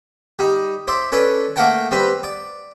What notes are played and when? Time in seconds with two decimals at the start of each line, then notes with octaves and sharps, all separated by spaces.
0.39 G3 D#4
0.88 C5 D5 E5
1.12 C#4 A4 B4 D5
1.56 A3 A#3 A#4 F#5 G5 A5
1.91 G3 C4 B4 B5
2.23 D5